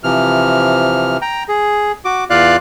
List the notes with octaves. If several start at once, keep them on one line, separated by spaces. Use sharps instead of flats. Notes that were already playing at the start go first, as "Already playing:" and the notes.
C3 E3 F3 F6
G5 A#5
G#4
F#4 D6
E2 F4 D5 F5 F#6